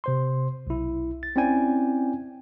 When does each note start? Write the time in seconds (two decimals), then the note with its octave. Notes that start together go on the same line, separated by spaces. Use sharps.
0.04 C3 C5 C6
0.67 B1 E4
1.23 A6
1.36 C4 C#4 E4 D5 G5 G#5